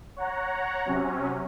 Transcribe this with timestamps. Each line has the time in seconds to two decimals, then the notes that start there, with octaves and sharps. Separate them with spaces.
0.16 C#5 F#5 A#5
0.86 C3 F#3 C#4